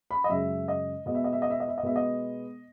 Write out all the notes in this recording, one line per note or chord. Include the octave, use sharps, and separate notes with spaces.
B5
D#5
F#2 C#3 G#3 E5
D#5
B2 G#3 B3 D#5
E5
D#5
E5
D#5
E5
D#5
E5
D#5
B2 G#3 B3 E5
D#5